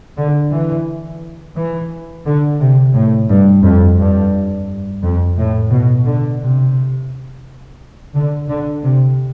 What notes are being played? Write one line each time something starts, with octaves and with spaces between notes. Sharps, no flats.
D3
E3
E3
D3
C3
A2
G2
F2
G2
F2
A2
B2
D3
C3
D3
D3
C3